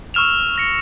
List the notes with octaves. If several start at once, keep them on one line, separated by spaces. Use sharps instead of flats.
C#6 E6 F6 E7 F7
F6 A#6 C#7